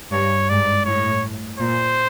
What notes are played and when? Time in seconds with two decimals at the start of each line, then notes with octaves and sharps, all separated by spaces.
0.12 G2 C#5
0.50 G#2 D5
0.85 A2 C#5
1.59 A#2 C5